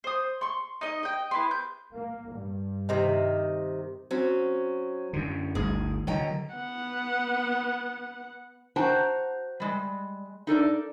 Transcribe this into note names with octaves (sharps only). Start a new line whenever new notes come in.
C5 D#6
C6 C#6
D#4 D#5
D#5 G5
B3 E4 C6
G6
A#3
G2
C3 D#3
F#3 C4 C#4
F#2 D3
G1 D2 G#4
D3 D#3 F#3 D#5 G5 A#5
B3 F#5
F#4 C5 G5 A5 A#5
G3 G#3
D#4 A4 A#4 D5